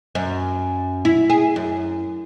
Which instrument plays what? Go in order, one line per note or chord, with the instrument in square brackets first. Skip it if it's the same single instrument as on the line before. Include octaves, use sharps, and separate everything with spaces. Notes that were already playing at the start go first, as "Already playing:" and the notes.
[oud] F#2
E4
G#4
F#2